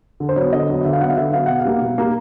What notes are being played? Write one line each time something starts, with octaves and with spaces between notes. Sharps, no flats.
D3
C5
F#3 B3 C#5
D3 D#5
F#3 B3
D3 E5
F5
F#3 B3 F#5
F5
D3 E5
F#3 B3 F5
B2 F#5
F5
G3 A#3
B2
G3 A#3